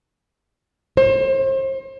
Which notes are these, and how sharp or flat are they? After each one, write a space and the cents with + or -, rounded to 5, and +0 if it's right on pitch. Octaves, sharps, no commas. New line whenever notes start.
C5 +35